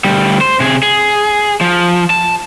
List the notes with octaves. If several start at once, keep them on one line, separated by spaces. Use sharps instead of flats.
D2 G3
C5
C3 G#4
G#4
F3
A5